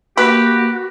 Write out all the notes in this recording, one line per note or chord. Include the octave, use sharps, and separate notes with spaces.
A#3 F#4 G4 B4